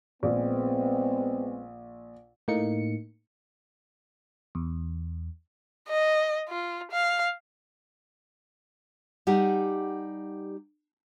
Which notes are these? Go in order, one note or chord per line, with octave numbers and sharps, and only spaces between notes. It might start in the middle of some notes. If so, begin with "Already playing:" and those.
A#1 G#3 B3 C4
A2 A#3 D#4 C#7
E2
D#5
F4
F5
G3 D#4 G4 F#5 G#5